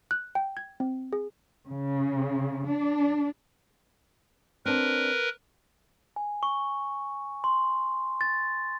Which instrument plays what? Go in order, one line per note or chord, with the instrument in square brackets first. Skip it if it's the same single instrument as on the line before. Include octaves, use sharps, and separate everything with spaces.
[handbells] F#6
G5
G#6
C4
G#4
[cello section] C#3
D4
[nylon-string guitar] C4 D4 [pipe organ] A#4 B4
[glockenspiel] G#5
C#6
C6
A6